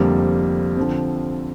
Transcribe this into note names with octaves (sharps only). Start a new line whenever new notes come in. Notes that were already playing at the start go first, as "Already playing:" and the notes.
Already playing: F1 F2 D3 G3 A#3
D3 F3 C4